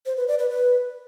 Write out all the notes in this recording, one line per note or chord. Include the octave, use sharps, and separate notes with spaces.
C5
B4
D5
B4
B4